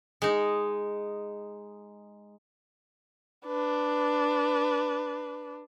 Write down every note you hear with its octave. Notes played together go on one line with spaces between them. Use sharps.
G#3 D#4
D4 B4